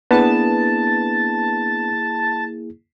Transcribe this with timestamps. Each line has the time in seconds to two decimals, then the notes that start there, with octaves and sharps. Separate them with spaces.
0.11 A#3 B3 D4 E4 G#4 B4 A5